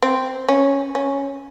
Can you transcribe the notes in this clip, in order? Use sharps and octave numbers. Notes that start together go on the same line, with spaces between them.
C4
C#4
C#4